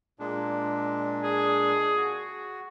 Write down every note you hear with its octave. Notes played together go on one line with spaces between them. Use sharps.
A#2 G#3 D4
G#4
F#4